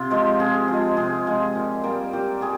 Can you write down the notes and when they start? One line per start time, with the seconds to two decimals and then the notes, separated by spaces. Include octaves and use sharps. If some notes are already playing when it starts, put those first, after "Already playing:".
Already playing: C3 F4
0.10 F3 G#3
0.39 C3 G#4
0.68 F3 G#3
0.97 C3 G#4
1.26 F3 G#3
1.55 A#2
1.83 G3 A#3
2.13 A#2 G4
2.41 G3 G#4